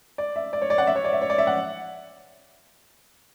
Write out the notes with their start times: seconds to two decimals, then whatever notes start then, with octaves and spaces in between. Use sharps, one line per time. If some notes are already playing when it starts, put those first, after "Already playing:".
0.18 D5
0.36 E5
0.53 D5
0.62 C#5
0.70 D5
0.78 F#5
0.87 E5
0.96 C#5
1.04 D5
1.13 E5
1.22 C#5
1.30 D5
1.38 E5
1.47 F#5